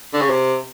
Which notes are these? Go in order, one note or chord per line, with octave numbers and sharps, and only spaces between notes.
D3
C#3
C3